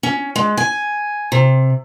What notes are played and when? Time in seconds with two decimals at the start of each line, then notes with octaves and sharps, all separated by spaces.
0.03 C#4
0.36 G#3
0.57 G#5
1.32 C3